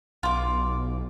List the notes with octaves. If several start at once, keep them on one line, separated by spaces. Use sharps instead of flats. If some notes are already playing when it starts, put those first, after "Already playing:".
B1 F4 D6